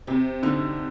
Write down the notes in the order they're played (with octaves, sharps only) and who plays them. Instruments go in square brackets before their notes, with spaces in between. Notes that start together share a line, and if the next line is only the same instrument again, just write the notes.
[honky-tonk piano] C3 [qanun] C4
[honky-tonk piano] D3 [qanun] D#4